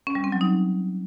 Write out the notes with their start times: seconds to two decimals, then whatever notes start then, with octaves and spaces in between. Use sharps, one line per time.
0.07 C#4
0.15 G3
0.24 C4
0.32 F#3
0.41 D#4